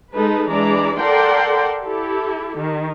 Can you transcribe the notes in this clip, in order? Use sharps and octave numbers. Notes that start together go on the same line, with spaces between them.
G#3 D#4 A4 B4
E3 G#3 D4 G#4 D5 A#5
A4 A#4 D5 F#5 G5 C6
E4 G4 A4
D#3